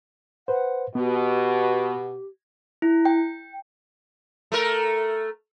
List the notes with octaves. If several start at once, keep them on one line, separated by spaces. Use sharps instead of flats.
B4 C5 F#5
B2 B3 G4
E4
G5
A3 A#4